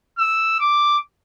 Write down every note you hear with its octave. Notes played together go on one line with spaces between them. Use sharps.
E6
D6